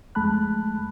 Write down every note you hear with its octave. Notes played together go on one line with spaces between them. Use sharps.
F2 G#3 A3 A5 B5 F#6